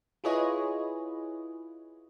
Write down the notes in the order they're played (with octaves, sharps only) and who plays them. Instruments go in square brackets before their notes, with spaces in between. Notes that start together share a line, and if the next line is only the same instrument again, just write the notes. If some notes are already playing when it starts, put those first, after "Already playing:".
[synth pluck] E4 F4 G#4 B4 C#5 D#5